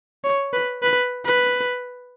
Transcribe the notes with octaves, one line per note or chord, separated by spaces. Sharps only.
C#5
B4
B4
B4